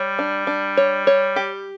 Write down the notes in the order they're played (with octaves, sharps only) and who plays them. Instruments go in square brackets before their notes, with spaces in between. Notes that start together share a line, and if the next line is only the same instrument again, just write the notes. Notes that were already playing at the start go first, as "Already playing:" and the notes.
Already playing: [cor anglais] G3 [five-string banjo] C#5
[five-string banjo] D4
D4
C#5
C#5
G4